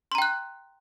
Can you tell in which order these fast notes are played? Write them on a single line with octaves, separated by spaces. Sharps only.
C6 A#5 G5 F#6